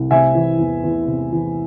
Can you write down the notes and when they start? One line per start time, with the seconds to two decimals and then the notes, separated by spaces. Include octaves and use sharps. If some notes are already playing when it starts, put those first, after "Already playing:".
Already playing: C2
0.11 C3 E5 G#5
0.35 E3
0.59 E2
0.84 E2
1.07 C3
1.32 E3